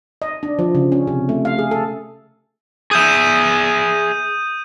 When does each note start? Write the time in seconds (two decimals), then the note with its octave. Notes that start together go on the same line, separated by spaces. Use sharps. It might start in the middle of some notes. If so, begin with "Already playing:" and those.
0.22 D#5
0.43 D4
0.59 F3
0.75 C#3
0.92 C#4
1.07 C3
1.29 A3
1.45 F5
1.59 G#4
1.71 A4
2.91 G#4 E5 D#6 G6 D#7